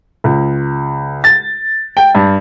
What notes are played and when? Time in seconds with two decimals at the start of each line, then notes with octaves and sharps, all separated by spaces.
0.24 C#2
1.24 A6
1.97 G5
2.15 G2